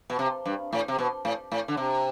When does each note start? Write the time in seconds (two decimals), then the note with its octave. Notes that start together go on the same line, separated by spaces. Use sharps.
0.10 B2
0.19 C3
0.45 G2
0.73 A2
0.88 C3
0.99 B2
1.25 A2
1.52 A2
1.68 D3
1.77 C3